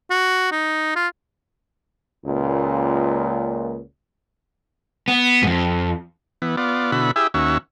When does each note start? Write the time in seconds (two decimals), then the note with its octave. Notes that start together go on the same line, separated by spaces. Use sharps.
0.10 F#4
0.51 D#4
0.96 F4
2.26 C#2 A#2
5.08 B3
5.43 F2 G#2
6.42 E3 B3
6.57 B3 F4 D5
6.92 B2 D3 E4 F#4 B5
7.16 E4 G4 G#4 E5
7.34 D#2 C#4 F#4 E5